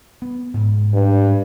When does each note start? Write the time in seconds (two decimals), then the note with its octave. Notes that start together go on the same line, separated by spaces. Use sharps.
0.22 B3
0.54 G#2
0.94 G2